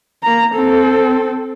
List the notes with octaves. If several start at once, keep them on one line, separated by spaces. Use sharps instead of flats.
A#3 A#5
C4 A4